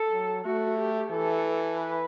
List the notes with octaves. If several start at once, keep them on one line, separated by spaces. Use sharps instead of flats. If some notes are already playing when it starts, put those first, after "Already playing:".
Already playing: A4
F#3
A3 F#4
G4
E3 A4
B4